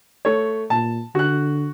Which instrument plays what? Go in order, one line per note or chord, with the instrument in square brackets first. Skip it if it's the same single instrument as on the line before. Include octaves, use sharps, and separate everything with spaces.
[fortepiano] A3 C#5
[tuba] A#2 [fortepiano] A5
[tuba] D3 [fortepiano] F#4 F#6